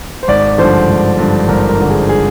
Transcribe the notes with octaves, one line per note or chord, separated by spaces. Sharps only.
C5
G#1 D5
G2 D3 F3 C5
G#1
G2 D3 F3
G#1 A#4
A#4
G2 D3 F3
G#4
G#4